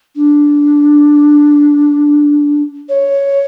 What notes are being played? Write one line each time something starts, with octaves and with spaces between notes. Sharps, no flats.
D4
C#5